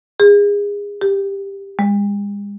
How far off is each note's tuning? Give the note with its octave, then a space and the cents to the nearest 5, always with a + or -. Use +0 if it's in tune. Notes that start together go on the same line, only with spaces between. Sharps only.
G#4 -30
G4 +10
G#3 -40